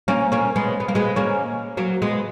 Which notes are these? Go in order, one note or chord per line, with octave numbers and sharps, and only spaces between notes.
A#3 C#4
A#3 C#4
G#3 B3
B3
A#3
G#3 B3
A#3 C#4
F#3 A#3
G#3 B3